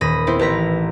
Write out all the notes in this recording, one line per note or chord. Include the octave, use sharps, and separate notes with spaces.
D#1 B5 D#6 A#6
B3 C4 E4 C5
A1 B4 A#5 B6